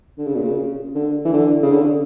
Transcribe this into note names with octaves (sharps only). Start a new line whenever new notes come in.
D3
C#3
A#2
C#3
D3
E3
D3
C#3
D3